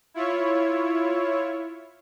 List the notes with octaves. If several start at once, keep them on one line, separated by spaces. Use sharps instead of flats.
E4 F4 C#5